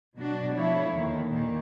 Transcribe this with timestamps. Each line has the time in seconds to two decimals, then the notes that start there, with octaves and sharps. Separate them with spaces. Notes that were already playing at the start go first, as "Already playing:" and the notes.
0.17 B2 F#3 D4 F#4
0.55 F3 A3 E4 C#5
0.94 D#2 D3 D#3
1.28 A#2 D#3